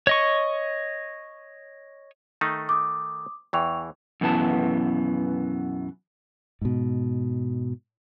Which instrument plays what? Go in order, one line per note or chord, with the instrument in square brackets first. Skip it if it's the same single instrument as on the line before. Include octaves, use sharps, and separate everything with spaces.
[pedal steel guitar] C#5 D#5 C#6
[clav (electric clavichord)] D#3 A3 D#4
[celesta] D6 D#6
[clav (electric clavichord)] E2 E3 [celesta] G5 C#6 F7
[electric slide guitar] F#2 B2 E3 B3 A5
[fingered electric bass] G#2 B2